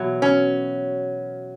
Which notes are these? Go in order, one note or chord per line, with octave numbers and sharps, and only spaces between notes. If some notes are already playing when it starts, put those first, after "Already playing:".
Already playing: E2 B2 F#3
C#4